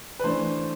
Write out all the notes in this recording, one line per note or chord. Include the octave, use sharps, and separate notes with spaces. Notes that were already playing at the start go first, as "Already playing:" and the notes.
B4
E3 A3 D4 C5